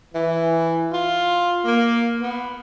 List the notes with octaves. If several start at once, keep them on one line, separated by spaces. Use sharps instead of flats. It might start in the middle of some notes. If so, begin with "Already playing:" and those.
E3
F4
A#3
B3